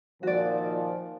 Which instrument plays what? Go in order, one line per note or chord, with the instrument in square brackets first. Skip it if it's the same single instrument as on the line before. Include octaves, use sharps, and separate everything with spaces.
[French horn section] A#2 D#3 F3 [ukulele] F#4 D5